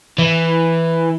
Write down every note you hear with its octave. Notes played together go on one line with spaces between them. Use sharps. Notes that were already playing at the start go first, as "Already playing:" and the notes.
E3